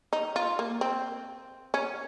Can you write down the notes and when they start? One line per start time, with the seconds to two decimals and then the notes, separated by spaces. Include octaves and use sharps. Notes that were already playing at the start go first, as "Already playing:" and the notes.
0.13 D#4
0.36 F4
0.59 A#3
0.81 C4
1.74 C#4